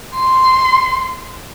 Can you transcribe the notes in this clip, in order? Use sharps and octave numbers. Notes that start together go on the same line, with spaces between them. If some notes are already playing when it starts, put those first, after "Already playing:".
C6